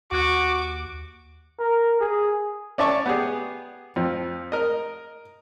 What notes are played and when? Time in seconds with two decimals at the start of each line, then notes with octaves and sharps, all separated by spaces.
0.12 D#2 F#4 D6
1.60 A#4
2.01 G#4
2.78 C#4 D5 E5 A5 C#6
3.06 B3 G4 G#4
3.96 F2 F3
4.52 A#4 D#5